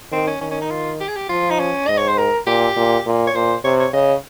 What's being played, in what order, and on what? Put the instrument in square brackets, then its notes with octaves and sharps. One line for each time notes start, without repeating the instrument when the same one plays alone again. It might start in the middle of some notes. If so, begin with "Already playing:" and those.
[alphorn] D#3 [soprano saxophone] C4
[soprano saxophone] C#4
[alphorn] D#3 [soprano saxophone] C#4
[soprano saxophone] C#4
D#4
F4
G4
G#4
G4
[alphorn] F3 [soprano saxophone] F4
[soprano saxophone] D#4
C#4
[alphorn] G#2 [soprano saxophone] D#5
[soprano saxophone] C#5
C5
A#4
[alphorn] A#2 [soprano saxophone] G4
[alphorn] A#2
A#2
[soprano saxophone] C#5
[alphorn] A#2 [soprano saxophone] C5
[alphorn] C3 [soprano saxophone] C#5
[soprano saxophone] C#5
[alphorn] C#3 [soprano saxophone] D#5